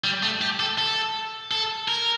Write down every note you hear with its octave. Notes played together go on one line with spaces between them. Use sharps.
G3
A3
G4
A4
A4
A4
A#4